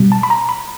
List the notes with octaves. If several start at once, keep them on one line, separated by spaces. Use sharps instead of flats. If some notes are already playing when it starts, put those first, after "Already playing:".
Already playing: B2 G3
A5
B5
A#5
B5